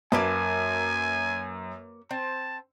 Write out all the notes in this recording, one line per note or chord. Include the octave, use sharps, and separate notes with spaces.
F#2 A#3 B4 G#5 A5
C4 A5